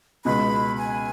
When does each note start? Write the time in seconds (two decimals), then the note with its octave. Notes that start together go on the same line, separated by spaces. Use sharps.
0.25 C#2 B2 G#3 B5
0.78 G#5